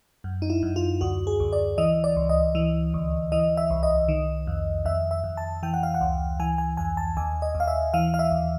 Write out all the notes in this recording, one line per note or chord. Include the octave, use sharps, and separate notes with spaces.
F#2
D#4
E4
F#2
F4
D2 F#4
G#4
D2
D5
E3 D#5
D5
C#2
D#5
E3
D2
E3 D#5
E5
C2
D#5
D#3
F2
F2 E5
E5
F2
A5
E3 G5
F#5
F5
F#5
C#2
E3 G#5
G#5
F2 G#5
A5
D#2 G#5
D#5
D#2
F5
E5
E3 F5
F5
E5
D#2